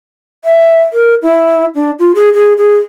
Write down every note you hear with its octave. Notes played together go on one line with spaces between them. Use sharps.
E5
A#4
E4
D4
F4
G#4
G#4
G#4